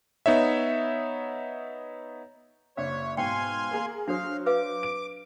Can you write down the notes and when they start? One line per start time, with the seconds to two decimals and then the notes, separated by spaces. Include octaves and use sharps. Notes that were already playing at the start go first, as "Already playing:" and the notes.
0.26 B3 D#4 C#5 E5
2.77 F#1 D4 C#5 E5
3.17 G#2 B2 F5 G5 G#5 C6
3.71 A#3 G#4 A#4
4.08 F#3 D4 A4 C5 F5
4.46 B4 F5 D6
4.83 D7